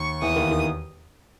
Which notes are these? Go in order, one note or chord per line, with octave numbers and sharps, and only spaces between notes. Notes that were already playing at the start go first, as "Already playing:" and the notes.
Already playing: D#2 C#6
E2 E3 D#6
D#2 D#3
D#3